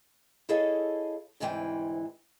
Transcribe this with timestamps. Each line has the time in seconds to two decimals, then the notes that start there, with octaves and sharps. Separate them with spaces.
0.49 E4 G#4 A4 C#5 D#5 F5
1.40 D2 G#2 C3 E3 C4 G5